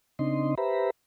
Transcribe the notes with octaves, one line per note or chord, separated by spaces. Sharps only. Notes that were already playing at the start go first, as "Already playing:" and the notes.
C#3 C4 D4 D#4 D#5 C6
G4 B4 C5 E5 A#5 B5